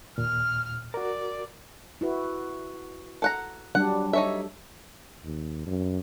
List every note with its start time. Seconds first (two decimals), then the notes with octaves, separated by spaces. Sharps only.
0.18 D#2 A#2 F6
0.94 F#4 A#4 D5
2.01 E4 F#4 B4
3.22 A4 F#5 A#5
3.75 F#3 G3 D4 F#5
4.13 D#4 A4 C#5 E5
5.24 D#2
5.66 F#2